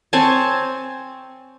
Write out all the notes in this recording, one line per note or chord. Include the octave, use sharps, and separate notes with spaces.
C4 C#5 G#5 A5